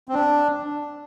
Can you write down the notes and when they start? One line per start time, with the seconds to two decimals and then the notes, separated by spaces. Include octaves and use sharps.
0.09 C4
0.14 D4